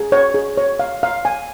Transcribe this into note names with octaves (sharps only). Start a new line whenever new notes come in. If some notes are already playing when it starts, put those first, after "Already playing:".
Already playing: G#4
C#5
G#4
C#5
F5
F5
G#5